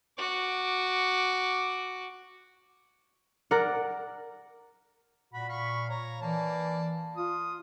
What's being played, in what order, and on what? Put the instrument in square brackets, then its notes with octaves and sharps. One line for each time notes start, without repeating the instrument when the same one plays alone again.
[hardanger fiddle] F#4 D6
[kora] A#4 D5 F#5
[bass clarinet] A#2 [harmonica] F#4 B5
[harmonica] F5 B5 C#6
C#5 A#5
[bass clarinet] E3 [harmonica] A#3 D5 A5
[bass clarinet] F4 [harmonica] D#6